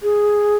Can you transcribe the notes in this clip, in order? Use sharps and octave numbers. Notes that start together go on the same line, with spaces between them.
G#4